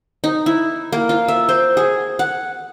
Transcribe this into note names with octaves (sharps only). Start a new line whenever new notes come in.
D#4
E4
A#3
F4
E5
C5
G#4
F#5